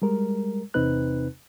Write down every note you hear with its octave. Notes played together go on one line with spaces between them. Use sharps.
G3 G#3 A#4
E2 C3 C4 D#4 B4 F#6